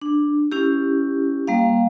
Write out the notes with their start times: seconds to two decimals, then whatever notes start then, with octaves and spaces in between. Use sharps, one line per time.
0.02 D4
0.52 C#4 E4 G4
1.47 G3 A#3 F5